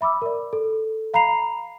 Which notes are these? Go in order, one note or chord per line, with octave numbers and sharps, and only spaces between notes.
E5 B5 D6 E6
A#4 D5
A4
F5 A#5 B5 C7 F7